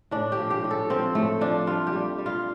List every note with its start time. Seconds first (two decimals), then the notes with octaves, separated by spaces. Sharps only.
0.11 A2 D4
0.32 G4
0.38 F3
0.50 G4
0.64 A2
0.71 A4
0.90 F3 C4
1.15 A2 A3
1.41 F3 D4
1.67 G3 F4
1.87 G4
1.93 G3
2.18 G3
2.26 F4